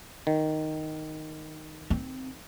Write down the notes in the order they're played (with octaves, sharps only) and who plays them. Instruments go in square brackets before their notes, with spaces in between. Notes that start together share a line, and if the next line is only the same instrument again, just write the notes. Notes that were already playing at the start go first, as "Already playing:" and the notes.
[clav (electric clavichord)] D#3
[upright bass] C4